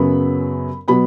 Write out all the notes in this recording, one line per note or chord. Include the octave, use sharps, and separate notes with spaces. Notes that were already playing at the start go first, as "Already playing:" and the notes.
Already playing: F#2 C#3 F#3 B3 B5
B2 F#3 B3 B5